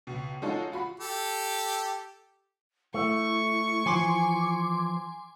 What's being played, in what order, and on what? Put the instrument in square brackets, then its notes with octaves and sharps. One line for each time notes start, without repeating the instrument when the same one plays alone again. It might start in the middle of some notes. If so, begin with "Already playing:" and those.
[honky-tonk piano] C#2 B2
G#3 C#4 D#4 F4 F#4 A4
F4 F#4 B5
[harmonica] G4 A4
[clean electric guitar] A3 [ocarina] E4 [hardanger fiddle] C#6
[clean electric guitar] E3 F3 [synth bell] G#5 C6 D6